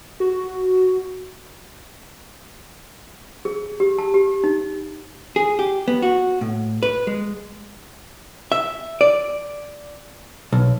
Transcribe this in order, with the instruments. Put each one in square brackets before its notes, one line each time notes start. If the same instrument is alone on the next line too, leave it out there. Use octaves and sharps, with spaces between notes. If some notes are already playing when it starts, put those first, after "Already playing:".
[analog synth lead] F#4
[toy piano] G#4
G4
A5
G4
D#4
[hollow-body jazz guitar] G#4
G4
B3
F#4
A2
B4
G#3
E5
D5
B1